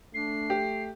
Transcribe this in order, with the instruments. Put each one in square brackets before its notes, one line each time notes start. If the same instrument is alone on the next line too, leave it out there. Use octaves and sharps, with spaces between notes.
[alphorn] A3 [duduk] D4 [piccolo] C7
[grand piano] G4